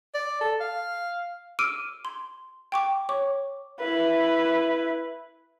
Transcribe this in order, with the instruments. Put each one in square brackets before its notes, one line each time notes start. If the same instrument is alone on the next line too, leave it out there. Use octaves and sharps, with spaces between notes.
[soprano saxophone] D5
A4
F5
[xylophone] D6 E6 F6 D7 D#7
C6
G5 C#6 D6
C#5 C#6 D6
[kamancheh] E4 B4